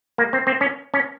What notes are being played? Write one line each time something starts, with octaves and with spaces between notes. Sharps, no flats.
A#3
C4
C4
C#4
C#4